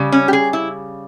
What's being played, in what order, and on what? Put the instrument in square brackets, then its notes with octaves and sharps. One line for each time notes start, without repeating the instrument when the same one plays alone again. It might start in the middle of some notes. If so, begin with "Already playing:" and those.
Already playing: [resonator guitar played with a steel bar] C#3 G3
C#4
G4
G#4
E4